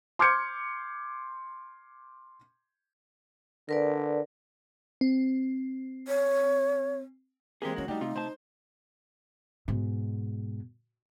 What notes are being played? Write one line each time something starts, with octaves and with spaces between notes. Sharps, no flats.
C6 D6 F6 G6 G#6 C#7
D3 A#4 B4 D5
C4
C#5
E3 G#3 A#3 C4 G4 G#4
D3 E3 C#4 F#4
G3 A3 D4 D#4 G4
C3 F4
C3 C5 A5
G#2 B2